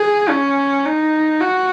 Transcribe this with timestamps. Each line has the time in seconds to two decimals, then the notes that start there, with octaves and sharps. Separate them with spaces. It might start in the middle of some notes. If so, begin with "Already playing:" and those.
Already playing: G#4
0.29 C#4
0.85 D#4
1.41 F#4